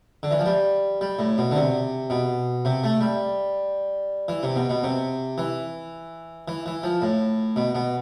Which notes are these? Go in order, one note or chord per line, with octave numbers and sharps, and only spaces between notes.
D3
E3
F3
G3
G3
A2
B2
D3
C3
B2
C3
A3
G3
E3
C3
B2
B2
C3
E3
E3
E3
F3
A2
B2
B2